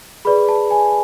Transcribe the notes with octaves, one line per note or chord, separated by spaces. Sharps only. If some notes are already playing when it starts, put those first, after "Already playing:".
G#4 B4 D5 B5
A5
G#5